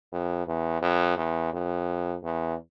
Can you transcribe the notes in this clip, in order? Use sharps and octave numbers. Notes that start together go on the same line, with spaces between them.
F2
E2
F2
E2
F2
E2